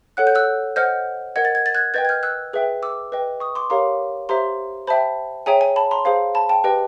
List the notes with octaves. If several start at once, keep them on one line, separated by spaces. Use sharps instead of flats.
A4 C#5 F#5 F#6
G6
E6 F#6
C5 D#5 F#5 F6 G6
A#4 D#5 F#5 G#6
A6
G#6
A6
F#6 G#6
B4 D#5 G5 G6 A6
G#6
F6 G6
E6 F#6
G#4 B4 E5 G5
D6 E6
B4 D#5 G5
C#6 D#6
C6 D6
G4 A#4 C#5 F5 A#5 C6
G4 C5 E5 A#5 C6
C5 E5 G5 A5 B5
G#4 C#5 E5 G5 G#5 A#5
G#5
A5 B5
A#5 C6
G#4 C5 F5
A5 B5
G5 A5
G4 B4 D#5 G5